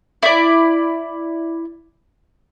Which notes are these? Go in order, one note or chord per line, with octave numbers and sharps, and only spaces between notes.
E4 D5